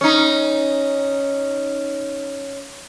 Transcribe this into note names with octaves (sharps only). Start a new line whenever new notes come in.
C#4 D#4